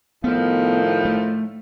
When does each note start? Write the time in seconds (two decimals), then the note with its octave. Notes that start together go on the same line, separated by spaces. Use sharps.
0.24 A2 D#3 F3 B3
1.05 A3